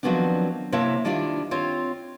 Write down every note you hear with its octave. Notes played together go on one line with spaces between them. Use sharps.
D#3 F3 F#3 B3 C4 D4
C3 A#3 E4 C#5 E5 A5
D#3 D4 E4 F4 G4 D5
C4 F4 C#5